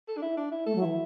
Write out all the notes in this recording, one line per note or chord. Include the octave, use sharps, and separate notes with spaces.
A4
D4
E4
D4
E4
A3 A4
F#3
E3 E4